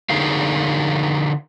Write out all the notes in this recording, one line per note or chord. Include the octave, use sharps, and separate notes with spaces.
D3 D#4 G#4 A#4 F5